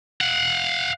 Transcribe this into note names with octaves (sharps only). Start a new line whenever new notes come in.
F5 F#5